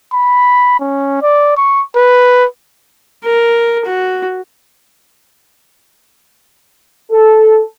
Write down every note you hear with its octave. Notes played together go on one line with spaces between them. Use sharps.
B5
C#4
D5
C#6
B4
A#4
F#4
A4